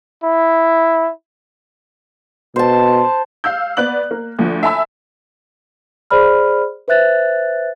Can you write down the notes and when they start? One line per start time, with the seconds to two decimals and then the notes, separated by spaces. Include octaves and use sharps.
0.24 E4
2.56 B2 C5 A5
3.44 F5 E6 G6
3.77 B3 D5 F#6 F#7
4.11 A#3
4.39 D2 F3
4.63 E5 G#5 A5 B5 E6
6.11 G#4 C5 D5 B5 F6
6.88 B4 C5 E5 F#6 A6